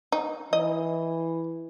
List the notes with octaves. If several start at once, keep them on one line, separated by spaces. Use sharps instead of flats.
D#4
E3 D#5